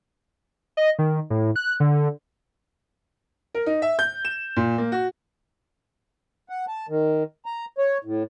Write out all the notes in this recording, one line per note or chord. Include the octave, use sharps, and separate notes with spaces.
D#5
D#3
A2
F#6
D3
A#4
D#4
E5
G6
E7
A#2
A#3
F#4
F#5
A5
D#3
A#5
C#5
A2